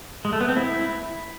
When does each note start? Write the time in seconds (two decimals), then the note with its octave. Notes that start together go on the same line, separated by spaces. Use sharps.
0.25 G#3
0.33 A3
0.41 B3
0.49 C4
0.56 E4